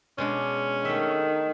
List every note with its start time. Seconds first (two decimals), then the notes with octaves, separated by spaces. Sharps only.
0.18 B2 G#3 C#4 D4
0.85 D#3 A3 E5